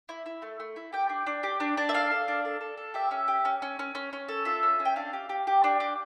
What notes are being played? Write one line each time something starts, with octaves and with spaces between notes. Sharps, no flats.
E4
E4
A3
A3
E4
G4 G5
D4
D4
G4
D4
D4
E5
A4 F5
A4
D4
A4
A4
A4
G4 E5
C#4
G4
C#4
C#4
C#4
C#4
C#4
A4
F4 E5
C#4
C#4
G5
D4 F5
G4
G4
G4
D4
G4